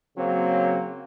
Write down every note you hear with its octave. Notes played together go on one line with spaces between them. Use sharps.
C#3 F#3 A#3 C4